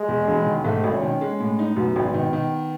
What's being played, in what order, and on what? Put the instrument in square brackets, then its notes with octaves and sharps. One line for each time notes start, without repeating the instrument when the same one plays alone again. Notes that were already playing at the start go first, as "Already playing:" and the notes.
Already playing: [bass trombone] G#3
[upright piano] E2
E1
D#3
[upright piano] G#2 [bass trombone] A3
[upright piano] G#1
[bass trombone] C#4
[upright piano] D#3
G#3
A2
D#4
[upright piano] F#2 [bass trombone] B3
[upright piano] G#1
D#3
D#3